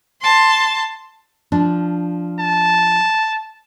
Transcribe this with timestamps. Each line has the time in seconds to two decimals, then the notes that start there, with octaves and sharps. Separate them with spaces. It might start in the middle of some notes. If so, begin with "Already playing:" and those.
0.22 A5 C6
1.52 F3 D4
2.39 A5